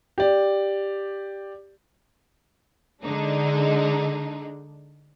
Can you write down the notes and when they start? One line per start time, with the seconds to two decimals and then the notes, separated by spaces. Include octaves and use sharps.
0.18 G4 D5
3.03 D3 G#3 D4 D#4